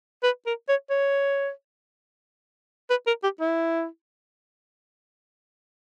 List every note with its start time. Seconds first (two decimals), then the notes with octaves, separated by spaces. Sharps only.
0.23 B4
0.46 A#4
0.68 C#5
0.90 C#5
2.90 B4
3.07 A#4
3.23 G4
3.40 E4